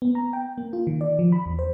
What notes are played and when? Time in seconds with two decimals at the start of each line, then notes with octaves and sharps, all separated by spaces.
0.02 B3
0.15 A#5
0.33 G5
0.58 A#3
0.73 F4
0.87 D#3
1.01 D5
1.19 F3
1.32 B5
1.46 E2
1.59 C5